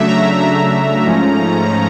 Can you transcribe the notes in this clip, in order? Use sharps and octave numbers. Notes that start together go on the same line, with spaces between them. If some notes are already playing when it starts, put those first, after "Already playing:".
Already playing: C#3 F#3 A3 D4 E5
A#5
A#5
G#2 F3 A3 C#4